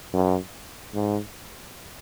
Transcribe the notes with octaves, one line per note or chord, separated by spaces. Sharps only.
F#2
G#2